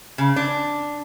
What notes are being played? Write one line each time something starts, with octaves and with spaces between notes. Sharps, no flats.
C#3
D4